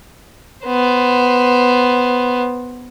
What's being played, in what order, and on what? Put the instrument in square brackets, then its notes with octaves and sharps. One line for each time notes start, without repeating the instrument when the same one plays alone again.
[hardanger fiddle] B3 C5